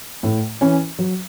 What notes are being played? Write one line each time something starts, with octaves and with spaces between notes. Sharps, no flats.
A2
E3 C#4
F#3